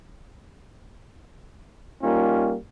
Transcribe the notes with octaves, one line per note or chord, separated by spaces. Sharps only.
G3 A#3 C#4 D#4 F4